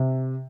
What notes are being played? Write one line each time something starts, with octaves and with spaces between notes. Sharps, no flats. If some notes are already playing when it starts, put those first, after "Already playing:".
Already playing: C3